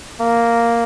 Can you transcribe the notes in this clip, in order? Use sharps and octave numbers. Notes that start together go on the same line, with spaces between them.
A#3